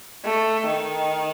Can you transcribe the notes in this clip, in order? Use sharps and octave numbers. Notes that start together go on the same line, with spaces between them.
A3
D#3